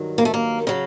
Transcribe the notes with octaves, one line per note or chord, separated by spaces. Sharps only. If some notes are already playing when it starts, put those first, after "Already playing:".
Already playing: G2 D#3 F#3
A#3
A3
A#3
C#3 F#3